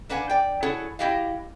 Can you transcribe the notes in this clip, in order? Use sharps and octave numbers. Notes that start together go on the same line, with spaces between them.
A#3 D4 B4 F#5 G#5
D5 G5
E4 F#4 G#4 A4 C#5 F#5
E4 F#4 G4 D#5 F5